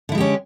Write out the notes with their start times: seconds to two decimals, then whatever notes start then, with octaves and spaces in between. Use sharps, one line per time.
0.09 D3
0.12 E4
0.15 G#3
0.18 G4
0.20 C#4